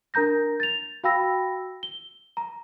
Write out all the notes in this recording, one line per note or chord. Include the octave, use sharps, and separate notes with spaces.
D4 A#4 A#5 G6 A#6
A6 F7
F#4 F5 G5 B5 E6 A#6
G7
A#5